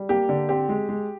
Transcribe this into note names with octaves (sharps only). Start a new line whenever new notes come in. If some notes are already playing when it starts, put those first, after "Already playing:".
Already playing: G3
A#3 G4
D3
C4 G4
G#3
G#3